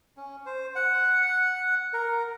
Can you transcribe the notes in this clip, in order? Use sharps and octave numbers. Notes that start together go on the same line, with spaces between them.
C#4
C5
F#5
A#4